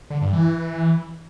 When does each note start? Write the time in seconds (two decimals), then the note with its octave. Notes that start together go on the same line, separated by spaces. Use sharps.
0.10 D3
0.22 G2
0.33 E3